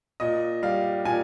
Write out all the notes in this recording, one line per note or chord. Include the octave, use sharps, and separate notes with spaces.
A#2 D#5
G3 F5
A#2 G#5